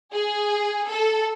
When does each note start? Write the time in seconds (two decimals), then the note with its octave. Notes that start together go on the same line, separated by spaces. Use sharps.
0.12 G#4
0.88 A4